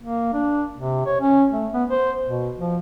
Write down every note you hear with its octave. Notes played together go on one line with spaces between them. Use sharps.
A#3
D4
C3
C#5
C#4
A3
B3
C5
B2
F3